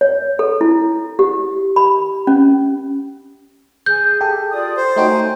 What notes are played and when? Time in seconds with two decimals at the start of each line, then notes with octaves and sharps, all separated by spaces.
0.01 C#5
0.39 A4
0.61 E4
1.19 G4
1.76 B5
2.27 C#4
3.86 G#4 G6
4.21 G4 A4
4.52 F4 D5 D#6
4.77 C5 C6
4.96 A3 D#4 F#4 C#5 G5
5.09 G#5